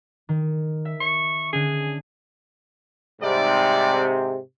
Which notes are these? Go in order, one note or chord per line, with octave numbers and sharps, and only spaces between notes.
D#3
E5
C#6
D3 C#4 G#4
G#2 C3 G3 D5